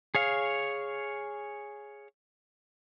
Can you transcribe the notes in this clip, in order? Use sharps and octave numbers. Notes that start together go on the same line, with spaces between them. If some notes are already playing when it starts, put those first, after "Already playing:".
G#4 C#5 F5